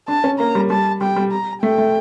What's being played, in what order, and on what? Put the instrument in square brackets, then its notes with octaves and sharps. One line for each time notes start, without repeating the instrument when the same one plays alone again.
[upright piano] D4 [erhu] A5
[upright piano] C#4
[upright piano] A#3 [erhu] A#5
[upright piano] G3
[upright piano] G3 [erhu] A5
[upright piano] G3 [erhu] G5
[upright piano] G3
[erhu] A#5
[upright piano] A3 [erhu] G5
[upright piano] A3